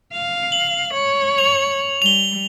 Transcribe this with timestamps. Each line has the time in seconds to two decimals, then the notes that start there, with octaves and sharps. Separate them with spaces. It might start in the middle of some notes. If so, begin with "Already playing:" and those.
0.13 F5
0.52 F#7
0.94 C#5
1.38 F7
2.02 G3 F7 G7